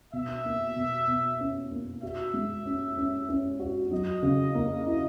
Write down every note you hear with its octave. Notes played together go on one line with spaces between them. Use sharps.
B2 E5
A#3
B2
B2
C#4
A#3
F#4 E5
G#3
C#4
C#4
C#4
F#4
F#3 D#5
C#3
A#3
E4